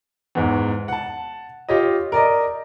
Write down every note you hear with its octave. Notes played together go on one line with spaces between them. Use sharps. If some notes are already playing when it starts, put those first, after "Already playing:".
E2 G#2
F#5 A5
F4 G4 C#5 D#5
A#4 D5 D#5